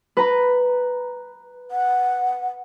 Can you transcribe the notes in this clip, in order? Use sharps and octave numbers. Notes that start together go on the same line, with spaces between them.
B4 A#5 B5
F#5